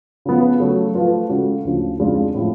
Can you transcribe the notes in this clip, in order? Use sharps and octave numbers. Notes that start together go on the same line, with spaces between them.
C#3 F3 B3
C#3 F#3 A3
F3 A3 F4 B4
C#3 G#3 C#4 F#4 A4
D2 C#3 F3
F2 C#3 G#3 D4 F4
A2 F3 G#3